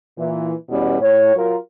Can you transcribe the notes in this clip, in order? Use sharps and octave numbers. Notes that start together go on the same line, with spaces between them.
A#2 E3
E2 B2 G3 B3 C#4
A2 C#5
F#3 F4 A#4